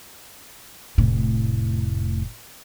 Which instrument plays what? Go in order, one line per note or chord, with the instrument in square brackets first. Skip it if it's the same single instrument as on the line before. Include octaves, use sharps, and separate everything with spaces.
[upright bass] F1 A2